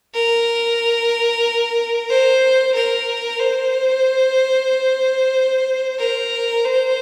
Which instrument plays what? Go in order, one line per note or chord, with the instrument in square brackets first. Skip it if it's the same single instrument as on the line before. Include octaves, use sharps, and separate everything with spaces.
[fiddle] A#4
C5
A#4
C5
A#4
C5